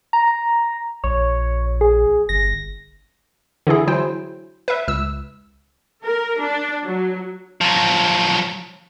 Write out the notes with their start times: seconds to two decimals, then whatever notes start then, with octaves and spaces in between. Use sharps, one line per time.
0.13 A#5
1.04 A#1 C#5
1.81 G#4
2.29 G1 A#6
3.67 D3 E3 E4 G#4
3.87 F#3 E4 C5 G5
4.68 B4 E5
4.88 C#2 E6
6.04 A#4
6.41 D4
6.85 F#3
7.61 F3 F#3